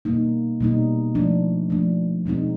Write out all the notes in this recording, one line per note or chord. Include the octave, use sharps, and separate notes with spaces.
B2 G3 A#3 D#4
B2 G3 A#3 D#4
F3 A3 D4
F3 A3 D4
B2 G#3 C4 D#4